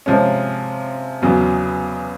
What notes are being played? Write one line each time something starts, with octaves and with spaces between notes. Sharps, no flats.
C3 F3 G#3 C#4
E2 C#3 F#3 B3